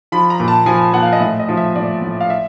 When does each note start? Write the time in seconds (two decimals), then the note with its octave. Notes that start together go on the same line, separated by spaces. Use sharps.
0.12 F3 B5
0.30 A#5
0.40 A#2
0.48 A5
0.66 F3 G#5
0.93 A#2 F#5
1.03 F5
1.13 D#5
1.21 A2 E5
1.40 D#5
1.49 F3
1.57 E5
1.76 A2 D5
2.02 A2
2.21 F5
2.30 E5